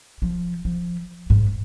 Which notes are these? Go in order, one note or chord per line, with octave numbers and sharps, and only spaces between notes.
F3
F3
G#2